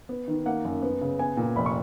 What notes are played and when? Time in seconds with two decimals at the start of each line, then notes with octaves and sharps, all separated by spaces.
0.09 B3
0.28 D#3
0.46 A#3 F#5
0.65 F#2
0.82 B3
1.01 C#3
1.19 B3 G#5
1.37 A#2
1.56 F1 B5
1.66 C#6